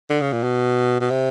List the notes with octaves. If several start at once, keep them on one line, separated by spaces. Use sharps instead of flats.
D3
C#3
A#2
B2
B2
C3